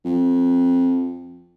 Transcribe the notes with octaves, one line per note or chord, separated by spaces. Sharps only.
F2